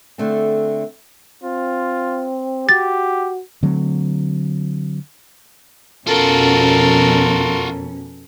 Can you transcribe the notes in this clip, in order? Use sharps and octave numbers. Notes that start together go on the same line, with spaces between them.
D3 A3 C4
C4 F4
F#4 G4 A6
D3 F#3 A3 C4
F2 B2 C#4 F4 F#4 A4 A#4